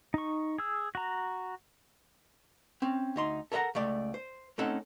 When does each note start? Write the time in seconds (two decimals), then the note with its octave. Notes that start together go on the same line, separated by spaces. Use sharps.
0.14 D#4 C#6
0.58 G#4 E6
0.95 F#4 A#5
2.82 C4 C#4
3.16 D2 D#4 C6
3.52 A4 A#4 D#5 F#5 A#5
3.75 C#2 A3 D5
4.14 C5
4.58 A3 C4 C#4 D#4 A4 F#5